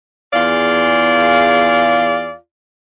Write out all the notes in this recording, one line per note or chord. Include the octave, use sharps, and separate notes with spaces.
E2 F4 G#4 D5 F5